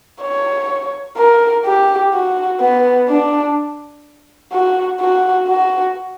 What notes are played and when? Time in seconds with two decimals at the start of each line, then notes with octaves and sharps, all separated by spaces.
0.22 C#5
1.17 A#4
1.65 G4
2.14 F#4
2.61 B3
3.09 D4
4.52 F#4
5.00 F#4
5.48 F#4